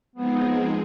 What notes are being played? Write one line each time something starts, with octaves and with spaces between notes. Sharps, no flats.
F3 G#3 B3 C4 D#4 G#4